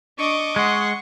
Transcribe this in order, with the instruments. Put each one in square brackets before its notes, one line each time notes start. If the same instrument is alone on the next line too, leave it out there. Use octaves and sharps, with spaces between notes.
[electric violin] D4 [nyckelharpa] D#5 D6 [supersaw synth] C#6
[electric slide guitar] G#3 [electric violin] F#5 C6